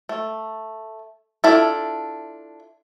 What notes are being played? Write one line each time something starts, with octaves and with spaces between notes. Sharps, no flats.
A3
D4 E4 F4 A4